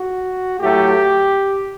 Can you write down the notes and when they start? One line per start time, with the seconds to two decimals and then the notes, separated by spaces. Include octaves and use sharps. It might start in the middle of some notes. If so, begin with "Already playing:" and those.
Already playing: F#4
0.60 A2 F#3 A3 G4